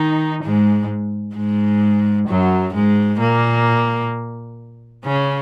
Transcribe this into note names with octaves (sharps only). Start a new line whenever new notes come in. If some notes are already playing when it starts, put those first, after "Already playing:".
Already playing: D#3 D#4
G#2 G#3
G#2 G#3
F#2 F#3
G#2 G#3
A#2 A#3
C#3 C#4